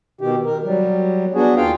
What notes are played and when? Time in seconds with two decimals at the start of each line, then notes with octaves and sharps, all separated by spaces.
0.21 B2 D#3 G4
0.45 A#4
0.65 F#3 G3
1.35 B3 D4 F#4 G#4
1.57 D#2 F4 F5 G5